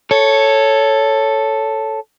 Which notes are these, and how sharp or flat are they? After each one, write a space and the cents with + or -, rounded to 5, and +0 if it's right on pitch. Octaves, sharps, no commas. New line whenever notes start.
A4 +0 C#5 +0